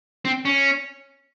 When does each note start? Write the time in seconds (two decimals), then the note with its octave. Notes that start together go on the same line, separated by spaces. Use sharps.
0.25 C4
0.45 C#4